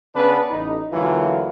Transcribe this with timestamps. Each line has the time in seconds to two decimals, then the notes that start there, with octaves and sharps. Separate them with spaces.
0.15 C#3 B3 C#4 D4 B4
0.51 A1 D#4
0.92 D2 D3 E3 F#3 A#3 F4